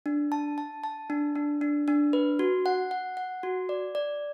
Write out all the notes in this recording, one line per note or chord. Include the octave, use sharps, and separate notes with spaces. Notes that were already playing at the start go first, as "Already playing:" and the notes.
D4
A5
A5
A5
D4
D4
D4
D4
B4
F#4
F#5
F#5
F#5
F#4
D5
D5